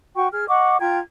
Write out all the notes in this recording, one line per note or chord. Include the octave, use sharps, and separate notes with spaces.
F#4 G5 C#6
G#4 F6
D#5 F#5 C#6 D6
F4 G5 A#5 G#6